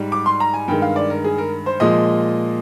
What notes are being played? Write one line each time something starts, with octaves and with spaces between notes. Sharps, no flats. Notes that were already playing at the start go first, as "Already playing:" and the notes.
Already playing: G#2 G3
D6
C6
A#5
G#5
G2 D#3 G#3 G5
F5
D5
A#4
G#4
A#4
C5
A#2 F3 G#3 D#5